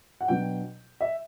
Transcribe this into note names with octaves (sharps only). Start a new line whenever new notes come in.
F#5
B2 F#3 B3 D4 G5
E5